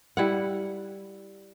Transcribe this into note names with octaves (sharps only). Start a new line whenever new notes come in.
G3 E4 F#5